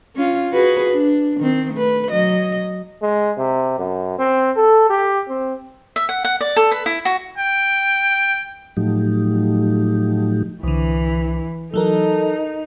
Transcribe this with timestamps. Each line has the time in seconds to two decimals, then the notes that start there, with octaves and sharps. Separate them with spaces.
0.16 C#4 F4
0.52 F#4 G#4 B4
0.90 D4
1.40 D#3 C4
1.73 A3 B4
2.09 F#3 D#5
3.02 G#3
3.37 C3
3.78 F#2
4.19 C4
4.56 A4
4.90 G4
5.28 C4
5.96 E5
6.09 F#5
6.24 F#5
6.41 D5
6.56 A4
6.71 B4
6.86 E4
7.05 F#4
7.38 G5
8.77 A2 F3 F#3 A3 D#4 G4
10.63 C2 D3 E3
11.74 E3 F#3 D#4 A4 A#4